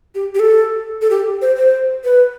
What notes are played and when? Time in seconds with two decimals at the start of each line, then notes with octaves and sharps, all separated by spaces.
0.15 G4
0.35 G4
0.40 A4
1.02 A4
1.10 G4
1.42 C5
1.57 C5
2.05 B4